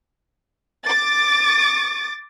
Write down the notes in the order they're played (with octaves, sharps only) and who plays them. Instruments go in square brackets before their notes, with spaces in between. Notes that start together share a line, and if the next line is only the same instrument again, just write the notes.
[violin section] D6 A6